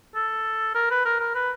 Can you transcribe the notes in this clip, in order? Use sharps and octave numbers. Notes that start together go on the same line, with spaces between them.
A4
A#4
B4
A#4
A#4
B4